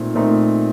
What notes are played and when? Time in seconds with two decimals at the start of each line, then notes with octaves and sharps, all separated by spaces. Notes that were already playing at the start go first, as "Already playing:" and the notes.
Already playing: A#2 A3 C4 D#4
0.15 A#2 A3 C4 D#4